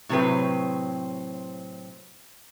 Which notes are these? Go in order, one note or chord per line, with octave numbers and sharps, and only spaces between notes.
A2 C3 F#3 C4 B4